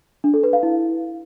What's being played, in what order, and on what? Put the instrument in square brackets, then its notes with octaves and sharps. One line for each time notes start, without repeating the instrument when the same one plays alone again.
[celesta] D4
A4
B4
F5
E4